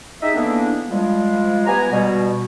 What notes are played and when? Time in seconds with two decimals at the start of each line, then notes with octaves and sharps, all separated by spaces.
0.22 D#4 G4 G#4 D#5 E5
0.35 D3 E3 A#3 B3 D4
0.89 F3 G3 G#3
1.66 B3 G4 G#5 A#5
1.91 B2 G3